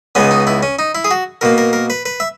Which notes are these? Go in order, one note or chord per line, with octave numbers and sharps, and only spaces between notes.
C#2 C#3 G#3 B3 C#4
D#4
E4
C#4
D#4
E4
G#4
F#4
B2 A#3 A#4
A#4
A#4
B4
B4
E5